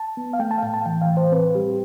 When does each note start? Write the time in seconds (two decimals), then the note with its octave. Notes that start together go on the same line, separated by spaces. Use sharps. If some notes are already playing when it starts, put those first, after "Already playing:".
Already playing: A5
0.17 B3
0.33 F5
0.39 A3 G5
0.51 A5
0.58 F5
0.62 A2 G5
0.74 A5
0.86 E3 G5
1.01 F5
1.09 A2
1.17 C5
1.32 C4 B4
1.55 G3 G4